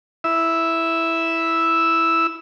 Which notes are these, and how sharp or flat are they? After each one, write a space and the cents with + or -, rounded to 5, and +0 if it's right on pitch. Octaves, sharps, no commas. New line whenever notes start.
E4 +0 E5 +0